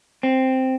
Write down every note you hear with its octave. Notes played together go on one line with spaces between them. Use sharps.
C4